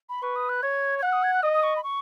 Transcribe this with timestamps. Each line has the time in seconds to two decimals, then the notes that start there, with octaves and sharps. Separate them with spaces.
0.09 B5
0.23 B4 C#6
0.36 D#6
0.49 F#6
0.63 C#5 G#6
0.99 G#6
1.03 F#5 F#6
1.13 D#6
1.23 G#6
1.33 F#6
1.43 D#5 D#6
1.53 D#6
1.63 C#6
1.76 B5
1.84 C#6